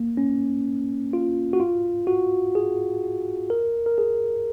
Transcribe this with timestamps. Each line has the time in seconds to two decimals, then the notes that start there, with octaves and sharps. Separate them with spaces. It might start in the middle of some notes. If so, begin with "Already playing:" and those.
Already playing: A#3
0.17 C#4
1.13 F4
1.53 F#4
1.60 F4
2.07 F#4
2.55 G#4
3.50 A#4
3.86 A#4
3.98 G#4